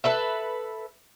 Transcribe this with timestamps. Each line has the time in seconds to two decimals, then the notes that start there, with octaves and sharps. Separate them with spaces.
0.04 A4 B4 E5